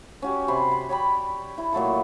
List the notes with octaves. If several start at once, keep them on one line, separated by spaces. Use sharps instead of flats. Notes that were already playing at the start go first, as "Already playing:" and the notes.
C#4 F#4 G4
C3 B5 C6
B5
C#5 D5 G5 B5
E4
A#2 F#3 A3 A4